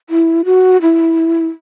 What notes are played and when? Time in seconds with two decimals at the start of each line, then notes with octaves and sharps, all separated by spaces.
0.10 E4
0.45 F#4
0.82 E4